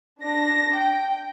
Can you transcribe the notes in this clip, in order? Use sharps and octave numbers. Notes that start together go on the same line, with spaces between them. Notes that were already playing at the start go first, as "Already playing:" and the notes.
D4 A#6
G5